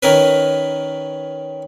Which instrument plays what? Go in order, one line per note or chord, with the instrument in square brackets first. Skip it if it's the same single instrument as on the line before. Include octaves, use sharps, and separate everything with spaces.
[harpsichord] D#3 C#4 A#4 B4